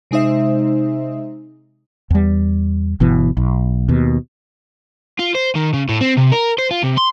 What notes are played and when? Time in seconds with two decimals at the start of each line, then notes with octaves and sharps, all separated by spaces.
0.11 C3 G#3 D#4 C5 E5
2.10 E2 G3
3.00 G1 B2 E3
3.37 B1
3.89 D#2 B2
5.19 F4
5.35 C5
5.55 D#3
5.73 C#3
5.89 A2
6.01 C4
6.17 C3
6.32 A#4
6.58 C5
6.71 F4
6.83 C3
6.98 C6